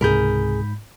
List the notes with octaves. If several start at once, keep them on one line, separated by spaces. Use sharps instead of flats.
C#2 G#2 C3 G#3 G#4 A#4 B5 G6